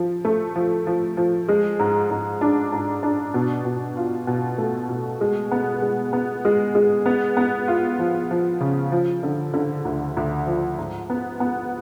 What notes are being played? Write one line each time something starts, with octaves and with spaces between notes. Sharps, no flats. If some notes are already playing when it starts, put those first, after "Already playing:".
Already playing: F3
A3
F3
F3
F3
G#3
G#2
G#2
D4
G#2
D4
B2
B2
F4
B2
A3
B2
G#3
B3
G#3
B3
G#3
G#3
B3
B3
F4
F3
F3
C#3
F3
D3
D3
D2
D2
F3
G#2
B3
B3